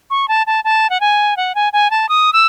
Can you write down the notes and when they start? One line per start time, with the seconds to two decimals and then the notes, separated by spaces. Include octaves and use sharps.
0.10 C#6
0.28 A5
0.47 A5
0.64 A5
0.90 F#5
1.00 G#5
1.37 F#5
1.55 G#5
1.73 G#5
1.90 A5
2.09 D#6
2.33 E6